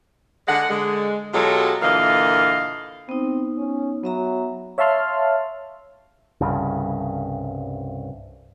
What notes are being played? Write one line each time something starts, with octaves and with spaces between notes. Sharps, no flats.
D3 G#3 F#5
D3 G#3
B2 F#3 G#3 F4 G4 A4
A#2 D3 E3 A#3 D#5 F5
B3 C4 D#4
C#4
F#3 B3 E5 A#5
C#5 E5 F5 A5 C6 F6
C2 G2 C#3